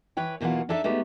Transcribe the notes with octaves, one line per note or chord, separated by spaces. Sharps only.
E3 B4 C#5 G5
D#2 B2 E3 F#3 F4 F#5
D4 D#4 A4 D5 E5
G#3 A3 B3 D#4 G4